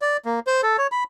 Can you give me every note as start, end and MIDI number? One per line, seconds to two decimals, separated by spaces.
0.02 0.17 74
0.25 0.40 58
0.47 0.61 72
0.63 0.77 69
0.78 0.87 73
0.92 1.04 83